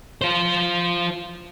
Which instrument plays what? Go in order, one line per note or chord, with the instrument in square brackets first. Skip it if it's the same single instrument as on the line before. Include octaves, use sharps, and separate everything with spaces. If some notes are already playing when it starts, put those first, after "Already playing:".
[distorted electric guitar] F4 C5